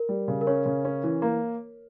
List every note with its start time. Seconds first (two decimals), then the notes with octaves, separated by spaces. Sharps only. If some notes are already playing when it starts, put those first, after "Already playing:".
Already playing: A#4
0.09 G3
0.28 C#3
0.41 A#4
0.47 C#4 C#5
0.66 C#3
0.85 C#4
1.03 E3
1.22 A#3